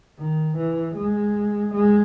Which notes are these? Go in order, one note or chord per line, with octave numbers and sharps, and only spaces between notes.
D#3
E3
G#3
G#3